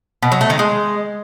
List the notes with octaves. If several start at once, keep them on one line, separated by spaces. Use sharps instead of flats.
B2
F#3
A3
D#3
G#3